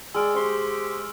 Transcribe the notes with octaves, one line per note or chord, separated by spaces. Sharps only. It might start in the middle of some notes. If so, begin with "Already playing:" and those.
G#3 D5 G#5 E6 F6 D7
G4 C5 C6 C#6